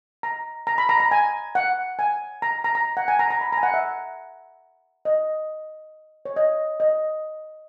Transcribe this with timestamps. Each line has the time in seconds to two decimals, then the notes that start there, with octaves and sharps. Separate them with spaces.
0.23 A#5
0.67 A#5
0.78 B5
0.89 A#5
1.00 A#5
1.11 G#5
1.55 F#5
1.99 G#5
2.42 A#5
2.64 A#5
2.75 A#5
2.97 F#5
3.08 G#5
3.19 A#5
3.30 A#5
3.41 B5
3.52 G#5 A#5
3.63 F#5
3.74 E5
5.05 D#5
6.25 C#5
6.36 D#5
6.80 D#5